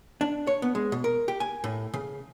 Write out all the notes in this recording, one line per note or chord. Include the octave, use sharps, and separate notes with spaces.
D4
C#5
B3
G#3
B2
A#4
G4
G#5
A2
C#3